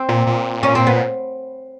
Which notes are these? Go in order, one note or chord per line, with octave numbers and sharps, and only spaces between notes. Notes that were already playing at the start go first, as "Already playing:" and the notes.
Already playing: C4
A#2
A#2
C#4
C4
B3